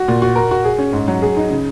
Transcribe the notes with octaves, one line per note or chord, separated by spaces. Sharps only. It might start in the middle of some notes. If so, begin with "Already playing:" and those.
Already playing: F#4
A#2
F#4
A#4
F#4
G#4
C#4
G#2
F#3
G#4
D#4
C#3